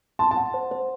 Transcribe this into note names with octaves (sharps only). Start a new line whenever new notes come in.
A5 C6
A5
F#5
C5
C5